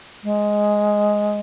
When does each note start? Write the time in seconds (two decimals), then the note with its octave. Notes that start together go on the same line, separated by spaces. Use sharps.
0.23 G#3